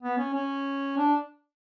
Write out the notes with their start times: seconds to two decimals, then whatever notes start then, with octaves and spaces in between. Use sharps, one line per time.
0.02 B3
0.18 C#4
0.34 C#4
0.98 D4